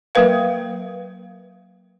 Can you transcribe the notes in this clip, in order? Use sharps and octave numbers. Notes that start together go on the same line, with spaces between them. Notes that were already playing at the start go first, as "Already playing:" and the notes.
F#3 A#3 A#4 B4 F5